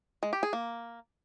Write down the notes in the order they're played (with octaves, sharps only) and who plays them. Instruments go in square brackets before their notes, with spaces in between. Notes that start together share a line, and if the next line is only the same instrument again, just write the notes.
[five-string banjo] G#3
G4
G#4
A#3